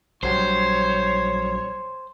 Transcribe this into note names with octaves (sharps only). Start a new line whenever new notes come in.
A#1 F#3 G3 C5 C#5